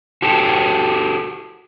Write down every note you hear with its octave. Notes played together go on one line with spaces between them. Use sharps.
F#4 G4 A4